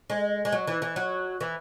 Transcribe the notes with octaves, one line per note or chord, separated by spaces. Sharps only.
G#3
G#3
F#3
E3
E3
F#3
E3